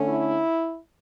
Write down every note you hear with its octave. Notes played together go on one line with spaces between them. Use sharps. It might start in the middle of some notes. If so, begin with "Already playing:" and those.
Already playing: D3 A3 C#4
E4